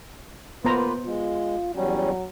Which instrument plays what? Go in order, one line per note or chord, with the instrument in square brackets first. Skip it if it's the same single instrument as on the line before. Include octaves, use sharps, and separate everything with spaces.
[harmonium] A#3 F4 B4 [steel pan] B3 C5 A#5
[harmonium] G#3 [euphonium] F4
[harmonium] E2 G3 C#4 [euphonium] F#3